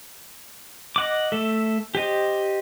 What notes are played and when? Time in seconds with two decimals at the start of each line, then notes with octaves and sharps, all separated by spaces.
0.96 D#5 F#5 D6
1.32 A3 A4 E5
1.95 G4 C5 D#5